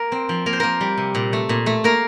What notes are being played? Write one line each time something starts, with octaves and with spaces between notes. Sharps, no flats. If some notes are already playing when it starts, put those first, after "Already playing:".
Already playing: A#3 A#4
C4
F3
A#3 A#4
C5
A#3 A#4
G3
C3
A#2
A3
A#2
A3
A#3 A#4